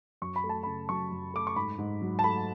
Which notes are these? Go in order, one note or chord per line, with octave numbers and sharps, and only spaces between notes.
F#2 C#6
B5
A3
A5
B5
C#3
F#3 C#6
F#2
A3 D6
C#6
G#2 B5
G#2
F#3
A5
A3 B5